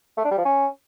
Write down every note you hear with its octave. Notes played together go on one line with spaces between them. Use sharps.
A3
D4
G3
F3
C#4